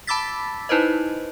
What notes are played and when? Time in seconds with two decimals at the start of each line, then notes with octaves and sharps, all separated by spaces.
0.07 A5 B5 D6 E6 A6 B6
0.69 D#4 E4 B4 C5 D#5